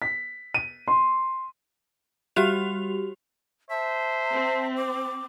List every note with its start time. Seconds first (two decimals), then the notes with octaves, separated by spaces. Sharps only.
0.02 B6
0.54 D#7
0.88 C6
2.36 G3 F#4 G4 F7
3.70 C5 E5 A5
4.34 C4
4.77 D6